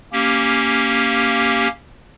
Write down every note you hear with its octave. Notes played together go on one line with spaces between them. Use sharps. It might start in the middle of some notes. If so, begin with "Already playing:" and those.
A#3 C#4 G4